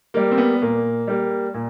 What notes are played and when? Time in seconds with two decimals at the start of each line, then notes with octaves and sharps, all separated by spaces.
0.14 G3 A#3
0.31 C4
0.38 B3
0.62 A#2 A#3
1.07 G3 A#3
1.54 A#2